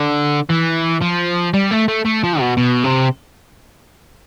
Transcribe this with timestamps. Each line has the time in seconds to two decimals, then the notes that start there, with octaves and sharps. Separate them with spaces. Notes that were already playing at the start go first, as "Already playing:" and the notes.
Already playing: D3
0.49 E3
1.02 F3
1.54 G3
1.71 A3
1.88 A3
2.05 A3
2.24 F3
2.40 B2
2.57 B2
2.84 C3